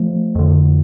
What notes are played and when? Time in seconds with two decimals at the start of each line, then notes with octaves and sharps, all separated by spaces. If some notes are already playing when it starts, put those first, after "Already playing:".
Already playing: F3 A3
0.35 F2 D3